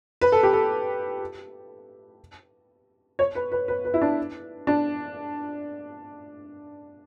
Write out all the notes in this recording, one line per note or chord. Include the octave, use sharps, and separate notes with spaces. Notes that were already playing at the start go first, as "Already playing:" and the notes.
B4
A4
G4
A4
C#5
B4
B4
B4
B4
E4
D4
D4